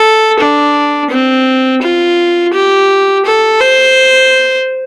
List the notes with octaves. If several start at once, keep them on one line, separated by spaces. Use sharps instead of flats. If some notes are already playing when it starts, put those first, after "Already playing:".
Already playing: A4
D4
C4
F4
G4
A4
C5